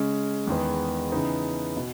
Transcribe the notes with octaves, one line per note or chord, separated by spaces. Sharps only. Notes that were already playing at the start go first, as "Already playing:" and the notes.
Already playing: C#3 G#3 C#4
E2 D#3 G#3 B3
C#3 E3 B3 D#4
B2